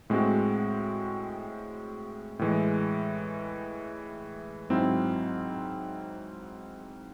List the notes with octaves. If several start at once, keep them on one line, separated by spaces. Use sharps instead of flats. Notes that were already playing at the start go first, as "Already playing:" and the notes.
A2 G#3 C4 F#4
A2 E3 G#3
G#2 F#3 C4 E4